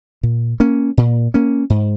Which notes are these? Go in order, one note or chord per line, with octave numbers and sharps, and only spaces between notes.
A#2
A#3 C#4
A#2
A#3 C#4
G#2